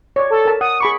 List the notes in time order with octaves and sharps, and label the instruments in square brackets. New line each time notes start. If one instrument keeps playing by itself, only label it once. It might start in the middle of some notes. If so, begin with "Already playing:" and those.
[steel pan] C#5 D5
[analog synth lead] A4
[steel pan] A#4 A5
[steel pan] F#5 [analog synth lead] D#6
[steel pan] G#4 B5 D6 [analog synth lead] C#6